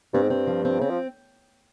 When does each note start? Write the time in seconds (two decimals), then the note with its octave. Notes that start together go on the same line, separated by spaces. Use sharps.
0.14 G2 C4
0.22 G#2
0.30 G2 C4
0.47 F3
0.65 C4
0.80 C#3 C4
0.90 F3